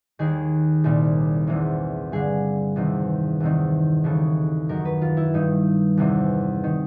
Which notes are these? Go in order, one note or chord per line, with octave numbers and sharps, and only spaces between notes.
D#2 D#3 G#4
C2 A#2
E2 C3 E3
G2 D3 G#4
E2 C3 D#3
E2 C3 D#3
D#2 C#3 E3 A4
F#2 D#3 A#4
B4
F4
E4
G2 D#3 D#4
E2 C3 E3
D#3